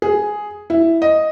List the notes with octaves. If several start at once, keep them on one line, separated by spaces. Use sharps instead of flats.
G#4
E4
D#5